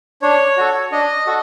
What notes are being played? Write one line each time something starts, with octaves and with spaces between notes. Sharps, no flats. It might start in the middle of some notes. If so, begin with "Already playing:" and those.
D4 C#5
F#4 A4
D4 D#5
F#4 A4